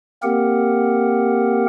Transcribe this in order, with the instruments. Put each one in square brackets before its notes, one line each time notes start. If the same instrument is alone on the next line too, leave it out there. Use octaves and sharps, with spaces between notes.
[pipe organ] A#3 C4 G4 A#4 F#5